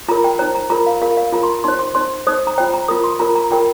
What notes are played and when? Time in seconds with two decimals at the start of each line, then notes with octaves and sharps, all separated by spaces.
0.08 F4 A#4 A#5
0.24 G5
0.39 D#4 C5 A#5
0.55 A#5
0.70 F4 A#4 A#5
0.86 F5
1.02 F4 A#4 F5
1.17 F5
1.33 F4 A#4 A#5
1.43 C6
1.64 D#4 C5 C6
1.79 C6
1.95 D#4 C5 C6
2.27 D#4 C5 D#6
2.47 A#5
2.58 F4 C5 G5
2.74 A#5
2.88 F4 A#4 D#6
3.04 C6
3.20 F4 A#4 A#5
3.36 A#5
3.51 F4 A#4 G5